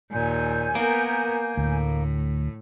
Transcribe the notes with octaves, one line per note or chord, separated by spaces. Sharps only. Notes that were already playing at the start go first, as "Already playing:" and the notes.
D#2 A#2 G#5 G6
A#3 B3 A#4
D2 A2